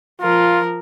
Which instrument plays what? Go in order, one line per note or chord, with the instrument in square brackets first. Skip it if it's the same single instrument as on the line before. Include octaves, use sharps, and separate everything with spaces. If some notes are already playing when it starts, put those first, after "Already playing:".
[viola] F3 A#4 [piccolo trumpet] F4